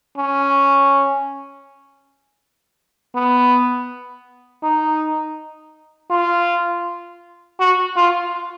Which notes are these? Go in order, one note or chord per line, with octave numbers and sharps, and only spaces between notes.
C#4
B3
D#4
F4
F#4
F4